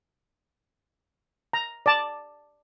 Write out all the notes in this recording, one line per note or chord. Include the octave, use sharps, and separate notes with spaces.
A#5
D5 A5